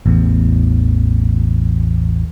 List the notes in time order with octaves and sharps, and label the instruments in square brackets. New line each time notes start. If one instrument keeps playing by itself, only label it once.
[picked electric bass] A1 E2